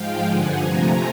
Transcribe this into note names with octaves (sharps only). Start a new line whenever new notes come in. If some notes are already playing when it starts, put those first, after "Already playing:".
Already playing: G#2 F3 G#3 F5 G5
G2 D3 F3 F#5 G#5
C3 F3 A3 G#5 A#5